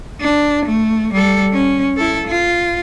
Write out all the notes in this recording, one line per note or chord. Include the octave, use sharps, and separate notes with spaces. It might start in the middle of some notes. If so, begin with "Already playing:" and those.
D4
A3
G3 A4
C#4
E4 A4
F4